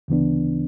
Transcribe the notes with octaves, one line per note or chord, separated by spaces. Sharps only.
D2 C#3 E3 B3 D4